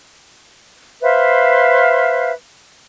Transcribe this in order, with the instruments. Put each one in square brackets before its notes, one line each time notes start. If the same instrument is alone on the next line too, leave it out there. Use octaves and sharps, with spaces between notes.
[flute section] B4 C5 E5 F5